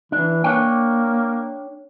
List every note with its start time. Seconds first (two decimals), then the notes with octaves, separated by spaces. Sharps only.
0.12 E3 D4
0.44 A#3 D4 C#5 G5